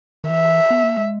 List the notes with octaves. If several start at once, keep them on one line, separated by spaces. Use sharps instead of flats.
D#3
E3 E5
B3
A#3
G#3